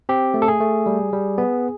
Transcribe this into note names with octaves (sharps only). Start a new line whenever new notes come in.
C4 G4
A3
A4
G#4
A3
G3
G3
B3